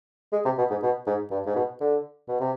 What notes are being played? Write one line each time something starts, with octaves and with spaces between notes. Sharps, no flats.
G#3
C3
B2
G#2
B2
G#2
G2
G#2
B2
D3
B2
C3